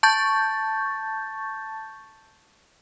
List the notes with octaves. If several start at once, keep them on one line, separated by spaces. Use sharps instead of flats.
A5 C#6 G6 A6